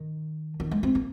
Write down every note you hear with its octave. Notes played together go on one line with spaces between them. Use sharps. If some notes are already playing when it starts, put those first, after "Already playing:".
Already playing: D#3
D#3
G#3
C4
A#3